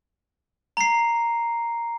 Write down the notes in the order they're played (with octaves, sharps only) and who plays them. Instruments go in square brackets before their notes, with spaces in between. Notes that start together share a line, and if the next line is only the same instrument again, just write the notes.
[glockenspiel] A#5 C7